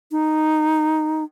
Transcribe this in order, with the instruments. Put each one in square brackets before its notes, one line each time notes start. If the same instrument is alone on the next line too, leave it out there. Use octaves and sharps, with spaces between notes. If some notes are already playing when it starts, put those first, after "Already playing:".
[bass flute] D#4